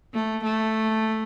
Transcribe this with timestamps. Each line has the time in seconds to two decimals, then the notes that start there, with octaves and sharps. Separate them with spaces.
0.14 A3
0.44 A3